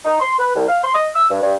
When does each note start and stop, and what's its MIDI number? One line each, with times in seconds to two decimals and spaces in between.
0.05 0.18 63
0.20 0.34 84
0.39 0.55 71
0.56 0.64 36
0.68 0.79 77
0.83 0.93 84
0.94 1.08 75
1.15 1.29 88
1.30 1.39 43
1.43 1.54 43